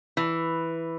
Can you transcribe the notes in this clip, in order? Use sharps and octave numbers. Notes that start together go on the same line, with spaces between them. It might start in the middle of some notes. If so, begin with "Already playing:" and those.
E3